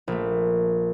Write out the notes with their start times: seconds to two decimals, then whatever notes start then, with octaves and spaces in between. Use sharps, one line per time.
0.08 A#1 A3